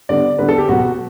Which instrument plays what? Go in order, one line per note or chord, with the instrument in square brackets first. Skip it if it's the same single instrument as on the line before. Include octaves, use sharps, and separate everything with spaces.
[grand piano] D3 G3 B3 D5
D3 G3 B3 B4
A4
G4
B2 F#3 B3 F#4